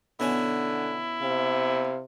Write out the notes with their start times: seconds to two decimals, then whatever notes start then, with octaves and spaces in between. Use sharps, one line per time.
0.20 B2 D3 C#4 E4 G#5
1.22 C3 F5